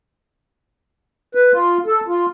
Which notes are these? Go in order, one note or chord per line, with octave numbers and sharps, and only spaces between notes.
B4
F4
A4
F4